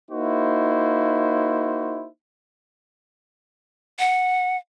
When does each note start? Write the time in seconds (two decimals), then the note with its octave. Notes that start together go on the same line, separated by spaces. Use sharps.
0.11 A#3 D#4 E4 F#4 C5
3.99 F#5